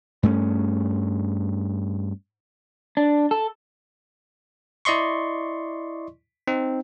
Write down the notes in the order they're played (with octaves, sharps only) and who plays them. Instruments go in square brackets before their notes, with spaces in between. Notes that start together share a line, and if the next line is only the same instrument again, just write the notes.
[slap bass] G2 A3 C4 C#4
[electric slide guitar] D4
A4
[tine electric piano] E4 D5 D#5 C6 C#6
C4 D#4